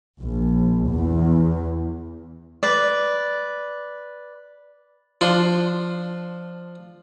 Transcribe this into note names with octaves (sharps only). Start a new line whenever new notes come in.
A#1
E2
B4 D5
F3 D4 C6